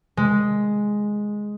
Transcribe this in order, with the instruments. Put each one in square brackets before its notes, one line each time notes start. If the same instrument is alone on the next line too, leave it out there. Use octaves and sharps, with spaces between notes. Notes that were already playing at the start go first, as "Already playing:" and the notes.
[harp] G#3